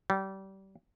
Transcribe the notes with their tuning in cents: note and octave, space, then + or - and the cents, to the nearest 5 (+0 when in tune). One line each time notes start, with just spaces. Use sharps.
G3 -25